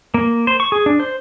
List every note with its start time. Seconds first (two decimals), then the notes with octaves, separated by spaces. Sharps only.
0.14 A#3
0.47 C5
0.60 C#6
0.72 G#4
0.86 D4
1.00 C5